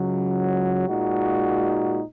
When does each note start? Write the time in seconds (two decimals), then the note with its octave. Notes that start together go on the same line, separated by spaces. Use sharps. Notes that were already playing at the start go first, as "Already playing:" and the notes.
Already playing: C#2 C#3 F#3
0.88 A#2 G#3 D#4 F#4